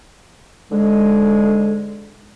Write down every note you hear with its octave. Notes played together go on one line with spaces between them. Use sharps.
G#2 D3 G#3